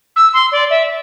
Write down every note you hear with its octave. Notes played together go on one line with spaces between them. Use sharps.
E6
C6
D5
E5